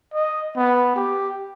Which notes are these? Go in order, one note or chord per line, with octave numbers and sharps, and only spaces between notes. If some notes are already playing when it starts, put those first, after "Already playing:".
D#5
B3
G4